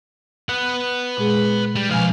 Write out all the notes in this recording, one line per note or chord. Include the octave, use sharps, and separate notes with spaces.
B4 F#5
A#2 G#3 G#4
G3
C#2 B2 F3 F5 G#5